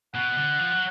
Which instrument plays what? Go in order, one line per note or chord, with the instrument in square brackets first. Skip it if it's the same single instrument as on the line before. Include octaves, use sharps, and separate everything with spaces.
[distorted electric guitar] B2 [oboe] F#5
[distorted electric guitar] D3
F3
F#3